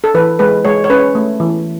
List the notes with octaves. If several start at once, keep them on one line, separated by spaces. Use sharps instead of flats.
A4
E3 B4
G#3 B4
G#3 C#5
C#5
C#4 B4
A3
E3